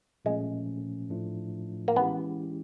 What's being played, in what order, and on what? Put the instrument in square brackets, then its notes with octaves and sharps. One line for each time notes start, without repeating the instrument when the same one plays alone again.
[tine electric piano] A#2 F3 A3 C#4 [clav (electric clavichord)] G#3
[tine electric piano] A2 F3 A3 D4 F4
[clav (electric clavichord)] A#3
[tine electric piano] E3 G#3 C#4 E4 G4 [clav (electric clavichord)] B3